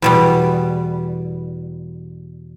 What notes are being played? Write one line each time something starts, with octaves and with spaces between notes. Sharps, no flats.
E2 B2 G3